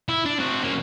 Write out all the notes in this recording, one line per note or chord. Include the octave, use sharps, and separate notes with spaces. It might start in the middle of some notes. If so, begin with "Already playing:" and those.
E4
D4
C4 F#4
C#3 A#3